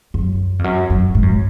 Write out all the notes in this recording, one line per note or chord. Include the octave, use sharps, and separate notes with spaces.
F#2
F2
F#2
F#2
G#2
F#2